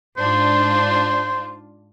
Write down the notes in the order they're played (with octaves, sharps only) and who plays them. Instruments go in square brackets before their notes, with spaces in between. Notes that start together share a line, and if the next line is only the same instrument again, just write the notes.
[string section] G#2 D4 F4 [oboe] C5